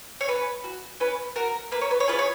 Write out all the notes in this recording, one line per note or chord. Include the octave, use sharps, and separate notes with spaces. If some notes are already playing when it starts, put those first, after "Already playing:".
C#5
C#4 B4
F#4
C#4 B4
F#4 A#4
A#3 B4
C#5
B4
C#5
C#4 F4 G#4 B4
C#5